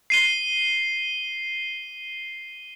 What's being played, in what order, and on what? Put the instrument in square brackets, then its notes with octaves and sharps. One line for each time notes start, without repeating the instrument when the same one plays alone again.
[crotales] C7 D#7 G7